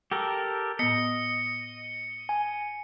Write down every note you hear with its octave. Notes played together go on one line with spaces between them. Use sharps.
G4 A4 A#4
A2 B3 D#5 C#7
G#5